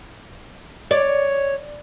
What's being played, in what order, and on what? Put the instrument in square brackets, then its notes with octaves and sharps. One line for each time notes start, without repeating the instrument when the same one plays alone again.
[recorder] C#5 [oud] D5